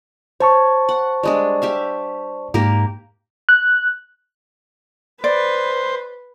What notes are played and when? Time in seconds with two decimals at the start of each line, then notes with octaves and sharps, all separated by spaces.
0.40 C5 C#5 A5 C#6
0.89 F#5
1.23 G3 G#3 D4
1.62 G4 E5 F5
2.54 G#2 A#3 G4 A#4
3.49 F#6
5.24 B4 C5 D5